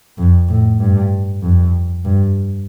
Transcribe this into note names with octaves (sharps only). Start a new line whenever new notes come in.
F2
A2
G2
F2
G2